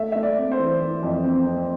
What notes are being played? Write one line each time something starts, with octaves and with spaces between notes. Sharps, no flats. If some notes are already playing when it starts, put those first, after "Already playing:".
Already playing: A3 E5
A3 E5
D5
C4
C5
E3
E3
F2
C4
C4